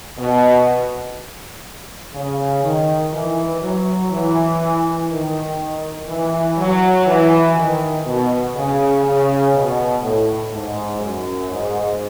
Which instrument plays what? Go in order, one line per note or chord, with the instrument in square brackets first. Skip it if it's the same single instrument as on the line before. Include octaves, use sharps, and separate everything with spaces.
[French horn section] B2
C#3
D#3
E3
F#3
E3
D#3
E3
F#3
E3
D#3
B2
C#3
C#3
B2
A2
G#2
F#2
G#2